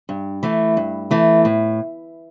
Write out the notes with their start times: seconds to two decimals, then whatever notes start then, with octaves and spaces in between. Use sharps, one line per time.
0.09 G2
0.43 E3 A3
0.77 G2
1.11 E3 A3
1.45 A2